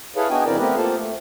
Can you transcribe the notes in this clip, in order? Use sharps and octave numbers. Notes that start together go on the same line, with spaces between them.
E4 G#4 A4 B4 C#5 F5
B3 D4 D#4 F#4 G5 G#5
F2 C#3 C4 E4 A#4 D5
A3 B3 C4 G4 A#4 B4
A#3 F4 A4 C5 F5
A3